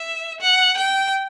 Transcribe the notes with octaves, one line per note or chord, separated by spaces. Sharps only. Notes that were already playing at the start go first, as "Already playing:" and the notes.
Already playing: E5
F#5
G5